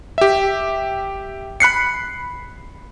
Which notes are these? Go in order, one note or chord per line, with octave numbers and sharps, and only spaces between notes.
G4 E5
B5 F#6 C7 C#7